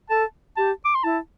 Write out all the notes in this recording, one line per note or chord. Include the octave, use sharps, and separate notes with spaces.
A4 A5
G4 A5
D6
C6
E4 A5